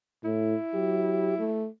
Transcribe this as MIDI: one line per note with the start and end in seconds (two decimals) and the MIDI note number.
0.24 0.55 45
0.24 1.66 64
0.74 1.39 54
0.74 1.34 67
1.39 1.67 57